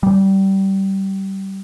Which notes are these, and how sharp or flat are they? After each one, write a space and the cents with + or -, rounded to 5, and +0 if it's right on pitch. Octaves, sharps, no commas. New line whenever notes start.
G3 -20